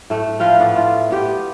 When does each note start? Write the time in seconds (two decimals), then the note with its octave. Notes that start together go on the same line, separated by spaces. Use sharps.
0.10 A2 A3
0.39 F3 B4 F5 G5
0.60 A2 B3 D5
0.75 A3 F4
1.10 B3 G4